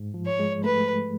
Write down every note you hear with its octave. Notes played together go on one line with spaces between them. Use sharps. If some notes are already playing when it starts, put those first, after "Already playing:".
Already playing: G#2
F3
C#5
G#3
A3 B4